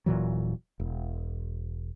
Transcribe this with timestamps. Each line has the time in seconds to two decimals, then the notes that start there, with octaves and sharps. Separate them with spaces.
0.06 D#1 A#2 E3 F#3
0.80 E1